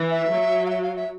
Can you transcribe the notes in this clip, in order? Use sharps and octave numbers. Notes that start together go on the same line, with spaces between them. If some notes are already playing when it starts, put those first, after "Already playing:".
Already playing: E3
E5
F#3
F5
E5
F5
E5